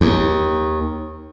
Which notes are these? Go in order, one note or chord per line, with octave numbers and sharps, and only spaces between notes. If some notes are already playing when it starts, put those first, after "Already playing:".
D#2